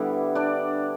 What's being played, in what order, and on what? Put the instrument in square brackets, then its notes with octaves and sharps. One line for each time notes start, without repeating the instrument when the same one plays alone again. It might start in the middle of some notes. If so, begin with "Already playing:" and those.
Already playing: [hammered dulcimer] D3 G3 B3 D4 E4 D5 E5
D4 D5